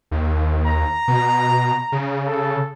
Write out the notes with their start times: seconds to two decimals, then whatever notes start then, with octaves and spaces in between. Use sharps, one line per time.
0.11 D#2
0.66 A#5
1.08 B2
1.92 C#3
2.27 A4